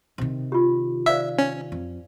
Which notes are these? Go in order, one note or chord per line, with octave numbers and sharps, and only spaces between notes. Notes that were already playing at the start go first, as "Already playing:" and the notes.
C3 D#3
F4 G4
C5 D5 E5 F5
C#4
F2